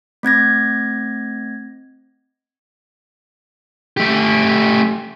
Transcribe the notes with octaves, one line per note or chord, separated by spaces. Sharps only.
A3 C4 G#6 A#6
A3 G4